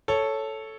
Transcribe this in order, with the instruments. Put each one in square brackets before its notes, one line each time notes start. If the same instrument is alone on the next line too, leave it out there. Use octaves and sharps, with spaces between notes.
[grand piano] A4 C#5